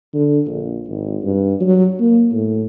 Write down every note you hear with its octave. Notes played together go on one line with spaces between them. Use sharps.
D3
A#1
G#1
G2
F#3
A#3
A2